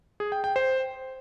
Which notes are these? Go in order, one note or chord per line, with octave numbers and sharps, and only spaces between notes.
G#4
G5
G5
C5